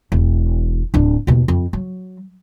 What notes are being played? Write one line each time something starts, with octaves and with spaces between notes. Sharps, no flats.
E1
D1 D4
D#2 B2
F2
F#3